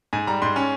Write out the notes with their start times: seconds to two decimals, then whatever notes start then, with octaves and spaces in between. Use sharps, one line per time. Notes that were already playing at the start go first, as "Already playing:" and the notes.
0.13 G#2 G#5
0.27 G3 A#5
0.42 G#2 C6
0.56 C#4